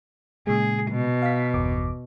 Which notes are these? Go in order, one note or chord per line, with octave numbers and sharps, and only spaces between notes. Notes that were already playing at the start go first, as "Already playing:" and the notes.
A#2 C#3 G#3 G#4
B2
F5 B6
G1 E2 D6